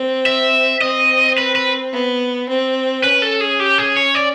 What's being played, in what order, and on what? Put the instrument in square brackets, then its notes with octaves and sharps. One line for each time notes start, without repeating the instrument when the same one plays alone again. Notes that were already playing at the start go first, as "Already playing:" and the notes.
Already playing: [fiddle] C4
[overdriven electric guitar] E5
[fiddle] C4 [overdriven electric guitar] D#5
[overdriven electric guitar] B4
B4
[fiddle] B3
C4
[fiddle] C#4 [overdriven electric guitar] B4
[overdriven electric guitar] A4
G#4
G4
G#4
C#5
D5